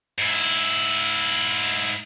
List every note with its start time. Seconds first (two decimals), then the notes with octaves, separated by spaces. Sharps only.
0.18 G#2 E4